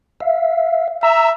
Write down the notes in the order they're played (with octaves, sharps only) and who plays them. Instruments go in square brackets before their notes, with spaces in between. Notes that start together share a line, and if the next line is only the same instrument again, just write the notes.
[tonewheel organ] E5 F5
[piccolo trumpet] E5 [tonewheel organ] A#5 E6